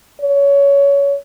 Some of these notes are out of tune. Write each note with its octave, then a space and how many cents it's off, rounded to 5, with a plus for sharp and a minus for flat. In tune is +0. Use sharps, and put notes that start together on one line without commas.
C#5 +20